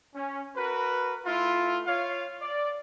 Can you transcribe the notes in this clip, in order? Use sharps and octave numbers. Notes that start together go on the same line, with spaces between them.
C#4
F#4 A#4 B4
A3 E4 F4
F4 C#5 F5
D5